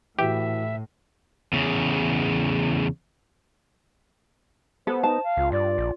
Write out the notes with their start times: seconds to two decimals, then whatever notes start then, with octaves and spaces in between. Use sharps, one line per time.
0.19 A2 E3 F#4 G4 E5
1.53 E2 C#3
4.87 B3 A4 C5
5.03 D#4 A5
5.23 F5
5.37 C#2 F4
5.52 G2 D5
5.78 A#1